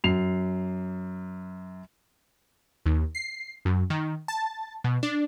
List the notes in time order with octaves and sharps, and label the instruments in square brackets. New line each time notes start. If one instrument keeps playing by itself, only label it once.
[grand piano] F#2 C7 F7
[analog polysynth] D#2
C7
F#2
D#3
A5
B2
D4